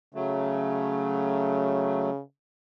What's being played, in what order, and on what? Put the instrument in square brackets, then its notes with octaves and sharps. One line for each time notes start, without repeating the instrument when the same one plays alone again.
[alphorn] C#3 [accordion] F#3 A3